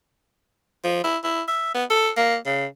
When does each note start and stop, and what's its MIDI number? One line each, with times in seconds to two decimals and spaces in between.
0.84 1.03 53
1.04 1.17 64
1.24 1.42 64
1.48 1.71 76
1.74 1.84 59
1.90 2.09 69
2.17 2.36 58
2.46 2.66 49